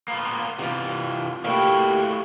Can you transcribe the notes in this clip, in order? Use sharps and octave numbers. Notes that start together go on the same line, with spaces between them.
A#3 B3 F4
C3 E3 F4 F#4
A3 A#3 E4 F#4 G4